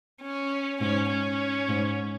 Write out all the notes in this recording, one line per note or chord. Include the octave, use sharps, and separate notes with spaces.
C#4
G#2 C#4
C#4
G#2